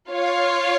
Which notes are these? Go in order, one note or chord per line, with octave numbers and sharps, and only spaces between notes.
F4 C#5 F5